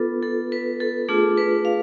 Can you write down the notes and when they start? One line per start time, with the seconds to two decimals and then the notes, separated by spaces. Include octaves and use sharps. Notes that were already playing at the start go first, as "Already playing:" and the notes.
Already playing: B3 D4 F4 A4 B4
0.23 A4
0.52 B4
0.80 A4
1.09 A3 D4 F4 G#4
1.37 B4
1.65 F5